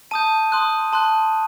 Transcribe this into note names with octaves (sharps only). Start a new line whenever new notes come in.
A5 D#6 G6 D#7
C6 D#6 F#6
A5 C6 F#6